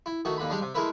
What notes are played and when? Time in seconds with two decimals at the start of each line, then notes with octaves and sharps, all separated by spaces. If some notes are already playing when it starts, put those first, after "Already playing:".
0.06 E4
0.25 D#3 A3 F#4
0.38 D#2 D3 B5
0.50 G3 G#3 D4
0.62 C3
0.74 G#3 A3 E4 A#4 B4 E5